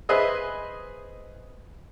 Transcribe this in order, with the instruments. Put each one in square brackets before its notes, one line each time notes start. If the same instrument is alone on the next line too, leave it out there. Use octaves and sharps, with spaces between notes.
[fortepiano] G#4 B4 C5 D#5 E5